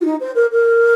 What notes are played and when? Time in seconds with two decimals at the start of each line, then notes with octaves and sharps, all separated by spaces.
0.01 F4
0.04 D#4
0.20 C5
0.35 A#4
0.51 A#4